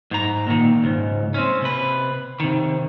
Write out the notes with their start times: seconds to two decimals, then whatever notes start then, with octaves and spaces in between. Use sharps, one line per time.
0.11 G#2 A#5
0.47 A#2 D#3
0.84 C#2 G#2
1.34 C4 C#4
1.61 C3 B4
2.40 C3 D#3